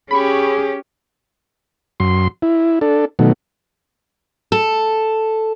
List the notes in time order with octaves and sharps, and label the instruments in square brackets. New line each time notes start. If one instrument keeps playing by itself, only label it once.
[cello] C#4 G4 [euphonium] G#4 [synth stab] B5 C#6
[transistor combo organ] F#2 C6
E4
D4 A4
B2 D#3 F#3 A3
[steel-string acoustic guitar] A4